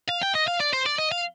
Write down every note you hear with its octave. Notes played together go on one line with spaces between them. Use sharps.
F5
G5
D#5
F5
D5
C5
D5
D#5
F5